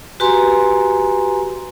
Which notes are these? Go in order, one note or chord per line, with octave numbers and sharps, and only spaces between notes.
F#4 G4 B4 G#5 A#5 C6